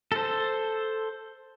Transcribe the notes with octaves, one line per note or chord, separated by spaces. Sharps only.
A4 C5